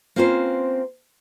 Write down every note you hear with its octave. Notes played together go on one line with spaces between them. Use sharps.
A#3 C4 C#4 F4 B4 C5